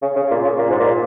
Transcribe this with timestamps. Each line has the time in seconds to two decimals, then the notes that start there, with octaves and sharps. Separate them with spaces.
0.02 C#3
0.16 C#3
0.31 A#2
0.45 C#3
0.59 A#2
0.70 G#2
0.80 A#2